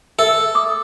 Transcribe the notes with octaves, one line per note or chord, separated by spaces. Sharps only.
A4 E5
D6 D#6